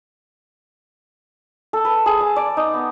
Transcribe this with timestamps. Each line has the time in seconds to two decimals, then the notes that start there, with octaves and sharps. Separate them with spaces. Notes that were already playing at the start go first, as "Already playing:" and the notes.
1.73 A4
1.85 B4
2.06 G#4
2.21 A5
2.36 D5
2.57 D#4
2.74 B3